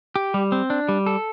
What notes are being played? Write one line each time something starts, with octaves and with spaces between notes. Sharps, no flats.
G4
G3
C4
D4
G3
A4